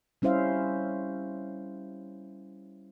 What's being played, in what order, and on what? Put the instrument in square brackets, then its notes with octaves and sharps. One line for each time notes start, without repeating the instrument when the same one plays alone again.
[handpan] G3 C#4 E4 C5 E5 F5